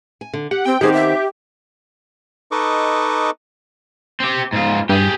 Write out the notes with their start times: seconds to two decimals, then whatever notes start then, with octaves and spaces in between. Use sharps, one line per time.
0.21 G#5
0.34 D3
0.51 G4 F#5
0.66 C4 G5
0.81 D#3 B3 C4 G4 G#4
0.93 E5
2.52 D#4 A4 B4 D#5 C#6 D6
4.20 C4 G4
4.53 G#2 F4
4.89 G2 G4 G#4